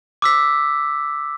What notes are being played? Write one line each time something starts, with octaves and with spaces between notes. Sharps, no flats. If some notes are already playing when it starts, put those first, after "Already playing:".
D6 E6 B6